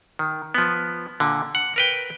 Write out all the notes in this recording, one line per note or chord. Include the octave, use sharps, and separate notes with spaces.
D#3
F3 B3
A#2 D3
F#5
A#4 B4 G5